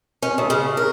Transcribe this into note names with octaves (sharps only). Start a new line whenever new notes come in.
C#4
D2
C#3
A#4